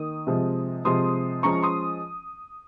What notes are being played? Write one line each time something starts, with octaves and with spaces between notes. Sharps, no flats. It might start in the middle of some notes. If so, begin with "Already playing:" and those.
Already playing: D#3 A#3 D#4 D#6
C3 F3 G#3
C3 F3 G#3 C6 D#6
F3 G#3 C#4 A#5 C#6
C6 D#6